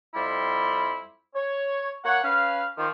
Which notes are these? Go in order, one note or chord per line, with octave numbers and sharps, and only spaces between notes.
F2 G3 E4 B5 C6
C#5
A#3 C#5 F#5
C#4 B4 F5
D#3 F3